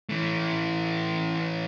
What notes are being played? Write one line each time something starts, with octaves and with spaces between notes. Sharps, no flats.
E3 A3